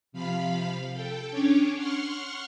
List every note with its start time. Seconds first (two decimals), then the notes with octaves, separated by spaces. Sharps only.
0.12 C3 F3 F5 B5
0.93 A4 G5
1.31 C#4 D4 C#5 D5
1.76 F#5 C6 C#6 F6